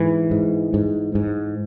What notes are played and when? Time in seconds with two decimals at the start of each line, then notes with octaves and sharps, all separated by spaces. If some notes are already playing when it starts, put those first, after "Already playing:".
Already playing: G#2 E3
0.31 G#2
0.74 G#2
1.15 G#2